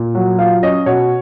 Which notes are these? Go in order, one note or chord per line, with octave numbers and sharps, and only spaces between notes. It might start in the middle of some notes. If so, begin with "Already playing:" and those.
Already playing: A#2
F#3
F4 F5
C#4 D#5
B2 C#5